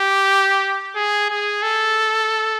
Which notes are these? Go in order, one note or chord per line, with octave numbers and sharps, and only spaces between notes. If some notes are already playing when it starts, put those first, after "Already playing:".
Already playing: G4
G#4
G#4
A4